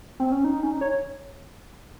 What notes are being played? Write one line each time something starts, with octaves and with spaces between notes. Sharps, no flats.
C4
C#4
D#4
C#4
D#4
C#5